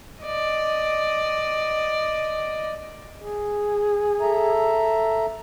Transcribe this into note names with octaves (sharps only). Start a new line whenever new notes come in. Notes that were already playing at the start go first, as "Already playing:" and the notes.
D5 D#5
G#4
A4 E5 A#5